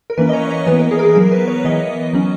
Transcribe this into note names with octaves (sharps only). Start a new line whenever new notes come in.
A#4
E3 A#3 C#4 B4
D#5
C#5
C#5
E3 B3 B4
A#4
G#4
A#4
G#4
F#3 B3 A#4
B4
C#5
E3 B3 D#5
F#3 C#4